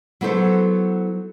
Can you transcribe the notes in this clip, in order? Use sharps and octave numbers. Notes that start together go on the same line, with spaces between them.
F#3 B3 E4 A4 C5